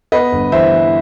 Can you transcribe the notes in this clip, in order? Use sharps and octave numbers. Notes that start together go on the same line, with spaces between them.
B3 B4 D#5
G1
E3 C5 E5
E3